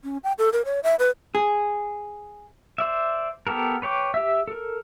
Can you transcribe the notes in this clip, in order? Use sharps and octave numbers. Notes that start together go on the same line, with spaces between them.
C#4
G5
A4
A#4
C#5
E5
B4
G#4
C5 D5 E5
B3 G4 A4 A#4
B4 C#5 G5 D6
G4 E5
A4 A#4